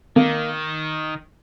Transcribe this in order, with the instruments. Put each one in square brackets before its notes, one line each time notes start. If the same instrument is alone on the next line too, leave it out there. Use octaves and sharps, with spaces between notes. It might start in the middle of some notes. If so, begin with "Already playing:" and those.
[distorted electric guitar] D#3 [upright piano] A#3